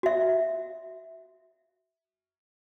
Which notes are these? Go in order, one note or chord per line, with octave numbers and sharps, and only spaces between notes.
F#4 E5